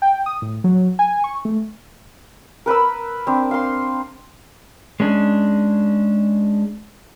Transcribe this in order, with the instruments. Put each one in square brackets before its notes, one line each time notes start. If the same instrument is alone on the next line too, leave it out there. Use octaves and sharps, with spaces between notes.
[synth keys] G5
D#6
A2
F#3
G#5
C#6
A3
[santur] A#4 B4 B5 E6
C4 D4
F5 C6
[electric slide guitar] G#3 C#4 D4